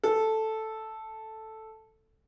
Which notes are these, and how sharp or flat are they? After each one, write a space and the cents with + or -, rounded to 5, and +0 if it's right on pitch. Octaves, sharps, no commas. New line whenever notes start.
A4 +0